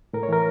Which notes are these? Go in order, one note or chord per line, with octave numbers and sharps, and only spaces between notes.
A2 A#4
C#5
E3 A#4